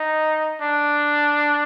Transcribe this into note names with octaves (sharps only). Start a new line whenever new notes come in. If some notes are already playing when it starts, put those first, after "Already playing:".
Already playing: D#4
D4